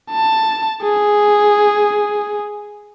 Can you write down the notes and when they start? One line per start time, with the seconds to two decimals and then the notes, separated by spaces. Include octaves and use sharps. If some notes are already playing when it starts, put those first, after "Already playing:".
0.11 A5
0.83 G#4